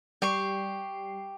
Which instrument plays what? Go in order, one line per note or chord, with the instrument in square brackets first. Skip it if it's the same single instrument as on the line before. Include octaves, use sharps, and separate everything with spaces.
[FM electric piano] G3 C7 [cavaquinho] G4 C#6